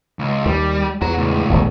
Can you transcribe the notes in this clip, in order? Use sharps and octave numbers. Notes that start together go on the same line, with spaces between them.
C#2
D#2 G3
E2 F#5 A#5
C#2 A2
D1 G1 E2